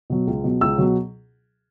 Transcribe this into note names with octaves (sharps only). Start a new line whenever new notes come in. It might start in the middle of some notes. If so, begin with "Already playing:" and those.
B2 F#3
C#2
B2 F#3
C#2 E6
B2 F#3